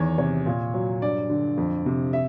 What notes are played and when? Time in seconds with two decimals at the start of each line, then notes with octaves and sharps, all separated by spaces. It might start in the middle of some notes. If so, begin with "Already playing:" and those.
Already playing: E2 D#3 C#5
0.18 C3 C#5
0.46 A#2
0.74 F#3
1.02 G2 D5
1.30 D3
1.57 F2
1.86 C3
2.13 E5